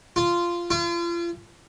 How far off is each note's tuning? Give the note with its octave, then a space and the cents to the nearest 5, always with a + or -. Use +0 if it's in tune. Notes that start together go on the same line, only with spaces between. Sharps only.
F4 -10
F4 -35